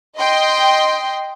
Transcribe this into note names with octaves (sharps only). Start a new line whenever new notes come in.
D#5 G5 C6